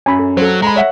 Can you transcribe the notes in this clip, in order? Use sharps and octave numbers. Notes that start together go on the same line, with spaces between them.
F#2 G#5 B5
A4
F#3 A4 C5
G#3 A#5 B5
C#5 E5 F#5